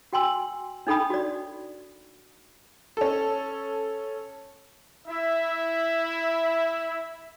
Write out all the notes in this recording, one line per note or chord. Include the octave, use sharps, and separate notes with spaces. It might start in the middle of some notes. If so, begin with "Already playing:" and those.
F#4 G5 G#5 C6 E6
D4 D#4 A4 G5 B5 D#6
F#4 D5
C#4 A4
E4 E5